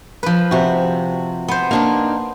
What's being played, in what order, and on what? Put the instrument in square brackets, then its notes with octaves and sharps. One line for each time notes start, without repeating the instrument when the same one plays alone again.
[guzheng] F3 B4
[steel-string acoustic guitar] C3 F#4
[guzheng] B3 C5
[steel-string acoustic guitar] A#3 D4 D#4